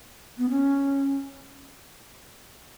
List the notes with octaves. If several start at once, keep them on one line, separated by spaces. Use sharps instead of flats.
B3
C#4